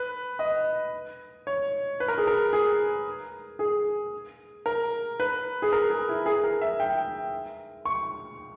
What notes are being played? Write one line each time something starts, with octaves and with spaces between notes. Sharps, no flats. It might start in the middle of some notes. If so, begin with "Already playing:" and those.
Already playing: B4
D#5
C#5
B4
A#4
G#4
A#4
G#4
G#4
A#4
B4
G#4
A#4
G#4
E4
G#4
A#4
E5
G5
C#6